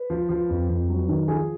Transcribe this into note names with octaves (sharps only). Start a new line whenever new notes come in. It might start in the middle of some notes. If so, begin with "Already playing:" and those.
Already playing: B4
F3
F3
F2
F2
F#3
D#3
F3 G#4 G#5